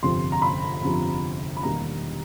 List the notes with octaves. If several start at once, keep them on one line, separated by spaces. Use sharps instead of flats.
G1 F2 C3 F3 C6
A#5
B5
G1 F2 C3 F3
B5
E1 D#2 D#3 G3 A#3 A#5